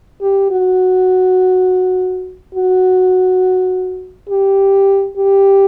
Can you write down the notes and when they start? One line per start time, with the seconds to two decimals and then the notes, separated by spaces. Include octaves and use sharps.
0.21 G4
0.51 F#4
2.54 F#4
4.29 G4
5.16 G4